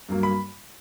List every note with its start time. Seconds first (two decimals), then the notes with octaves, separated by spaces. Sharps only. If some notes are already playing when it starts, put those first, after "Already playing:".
0.09 G2 F#3 A#3
0.23 B5